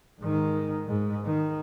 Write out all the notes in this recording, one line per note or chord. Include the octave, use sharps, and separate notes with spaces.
G#2 D#3
G#2
D#3